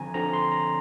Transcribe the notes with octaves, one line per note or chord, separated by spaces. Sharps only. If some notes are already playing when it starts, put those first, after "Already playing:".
Already playing: D3 F3 C4 G#5 A#5
D3 F3 C4 A#5
C6
A#5